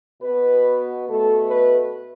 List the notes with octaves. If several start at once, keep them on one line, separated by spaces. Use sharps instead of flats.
B2 B3 B4
B2 A3 A4
B4